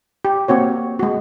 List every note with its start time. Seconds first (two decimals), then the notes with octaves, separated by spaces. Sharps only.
0.25 G4
0.48 A#3 C4 F#4 C#5
0.99 G#3 F#4